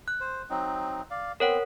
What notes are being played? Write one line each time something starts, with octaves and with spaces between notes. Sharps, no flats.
F#6
C5
F#3 C4 D#4
D5 F5
B3 C4 A#4 C#5 F#5